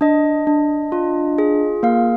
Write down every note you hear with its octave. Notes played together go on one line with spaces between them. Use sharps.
D4 D#5
D4
F4
G#4
A#3 F5